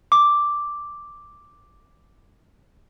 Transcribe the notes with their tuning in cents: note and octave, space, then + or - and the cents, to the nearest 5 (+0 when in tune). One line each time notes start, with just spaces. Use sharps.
D6 +0